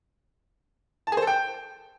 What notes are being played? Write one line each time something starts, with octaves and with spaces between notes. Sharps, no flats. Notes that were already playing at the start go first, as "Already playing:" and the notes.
A5
G#4
C5
A4
G5